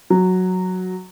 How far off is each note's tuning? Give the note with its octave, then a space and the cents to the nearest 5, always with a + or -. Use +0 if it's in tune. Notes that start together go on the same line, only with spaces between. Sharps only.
F#3 -5